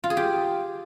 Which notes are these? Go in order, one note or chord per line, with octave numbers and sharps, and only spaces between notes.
F4
G#4
G4